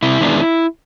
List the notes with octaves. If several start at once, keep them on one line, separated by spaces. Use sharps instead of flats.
C3 E4
D#3 G#3 B3 D4